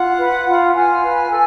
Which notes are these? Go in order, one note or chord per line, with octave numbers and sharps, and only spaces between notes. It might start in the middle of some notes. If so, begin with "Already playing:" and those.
Already playing: F4 F#5
B4
F4
F4 G#5
B4
A4